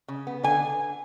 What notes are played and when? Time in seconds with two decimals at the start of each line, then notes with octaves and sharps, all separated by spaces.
0.08 C#3
0.27 B3
0.43 D3 G#5